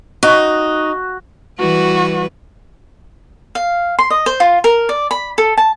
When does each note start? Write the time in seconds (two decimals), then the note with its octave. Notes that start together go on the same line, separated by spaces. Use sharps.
0.23 D#4 F#4
1.59 E3 G3 F#4 B4
3.55 F5
3.99 C6
4.10 D#5
4.26 C5
4.40 F4
4.64 A#4
4.89 D5
5.11 B5
5.38 A4
5.58 A5